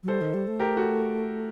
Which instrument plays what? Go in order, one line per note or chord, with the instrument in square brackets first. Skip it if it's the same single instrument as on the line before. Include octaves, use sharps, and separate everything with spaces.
[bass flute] F#3
[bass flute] G3 [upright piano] A4 C5
[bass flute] D#3
G3
A3
[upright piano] G4 A#4
F#4 A4